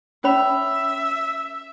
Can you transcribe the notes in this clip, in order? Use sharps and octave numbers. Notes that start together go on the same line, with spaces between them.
C#4 C#5 E5 B5